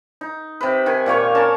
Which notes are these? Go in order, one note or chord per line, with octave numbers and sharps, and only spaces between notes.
D#4
C3 B4
D#3 G#5
A#2 A#3 C#5 C#6
C#4 A#4 A5